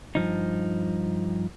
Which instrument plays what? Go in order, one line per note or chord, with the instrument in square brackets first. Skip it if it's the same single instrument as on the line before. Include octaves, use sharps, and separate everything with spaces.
[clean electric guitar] G2 F3 D#4